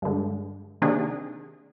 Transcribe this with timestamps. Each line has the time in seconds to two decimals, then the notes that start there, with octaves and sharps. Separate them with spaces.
0.02 G2 D3 G#3
0.82 C3 D#3 A#3 D4 G#4